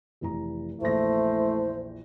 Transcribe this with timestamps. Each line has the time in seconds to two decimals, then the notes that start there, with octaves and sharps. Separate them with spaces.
0.21 F1 E3 A#5
0.81 A#1 E2 A3 E4 C5 A#6